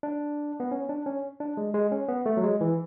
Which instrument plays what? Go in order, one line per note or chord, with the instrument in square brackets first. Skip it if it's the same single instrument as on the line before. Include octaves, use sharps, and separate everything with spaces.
[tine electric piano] D4
B3
C#4
D4
C#4
D4
G#3
G#3
C#4
B3
A3
F#3
G#3
E3